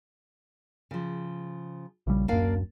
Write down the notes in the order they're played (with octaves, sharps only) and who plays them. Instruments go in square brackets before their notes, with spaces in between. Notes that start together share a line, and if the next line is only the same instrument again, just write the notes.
[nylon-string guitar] C#3 F3
[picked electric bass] A#1 C#3 G3
[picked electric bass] D1 F#2 [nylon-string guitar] A#3 D4 F5